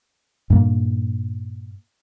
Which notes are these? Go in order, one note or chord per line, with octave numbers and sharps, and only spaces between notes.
G2 A#2 A#3